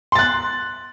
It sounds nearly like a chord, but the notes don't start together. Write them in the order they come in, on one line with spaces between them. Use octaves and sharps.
C6 A6 F#6